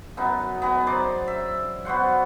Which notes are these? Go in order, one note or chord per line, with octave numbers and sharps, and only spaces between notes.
F#2 B3 D#4
B3 G#4 D#5
D#4 C5 D5
E5
B3 F#4 C5 F#5